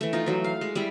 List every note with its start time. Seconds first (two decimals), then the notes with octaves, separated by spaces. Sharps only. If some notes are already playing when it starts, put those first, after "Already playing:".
0.01 E3 A3
0.13 D#4 F4
0.26 E3 F#3
0.44 F5
0.61 G#3
0.75 G3 E4